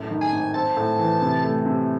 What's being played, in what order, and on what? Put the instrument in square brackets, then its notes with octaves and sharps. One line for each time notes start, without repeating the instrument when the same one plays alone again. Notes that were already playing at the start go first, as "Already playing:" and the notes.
Already playing: [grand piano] F#2 A2
D#3
[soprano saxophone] G#5
[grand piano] G#1
[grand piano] C4 [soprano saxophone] A5
[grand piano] A2
E3
C3
A3
C3